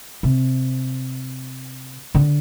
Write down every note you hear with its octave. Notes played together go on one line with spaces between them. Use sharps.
C3
D3